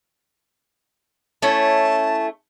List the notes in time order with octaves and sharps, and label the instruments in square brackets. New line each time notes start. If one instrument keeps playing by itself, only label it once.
[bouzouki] A3 C#4 E4 [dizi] A5